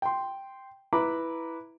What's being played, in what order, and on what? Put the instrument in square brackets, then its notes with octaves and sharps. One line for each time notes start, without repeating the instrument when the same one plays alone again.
[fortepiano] G5 C6
E4 B4 A#5 B5 D6